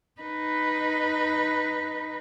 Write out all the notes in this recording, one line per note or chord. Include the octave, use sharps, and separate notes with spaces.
D#4 B4